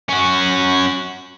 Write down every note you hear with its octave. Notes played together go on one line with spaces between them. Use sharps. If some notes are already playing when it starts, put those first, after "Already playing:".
C#4 F#4